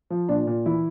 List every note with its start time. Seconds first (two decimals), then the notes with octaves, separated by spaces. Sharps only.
0.10 F3
0.29 A#2 D4
0.47 A#2
0.66 E3 E4